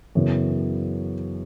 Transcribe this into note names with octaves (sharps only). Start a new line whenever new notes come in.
F#2 C#3 E3 B3